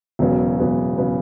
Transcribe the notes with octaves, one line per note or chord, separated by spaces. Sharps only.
E1 E2 C#3 F#3 B3
E1 E2 C#3 F#3 B3
C#3 F#3 B3